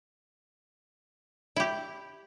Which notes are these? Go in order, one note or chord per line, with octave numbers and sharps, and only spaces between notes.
E4 G4